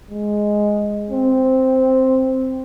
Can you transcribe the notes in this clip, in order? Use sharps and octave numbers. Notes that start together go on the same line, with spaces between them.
G#3
C4